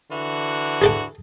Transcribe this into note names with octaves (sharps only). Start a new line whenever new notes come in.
D3 E3 F#4
G#4 A4 G5